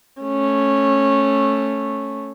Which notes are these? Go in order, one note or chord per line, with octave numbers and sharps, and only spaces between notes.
A3 C#4